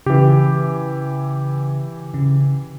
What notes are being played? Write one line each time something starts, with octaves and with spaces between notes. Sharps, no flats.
C#3 E3 G4
C#3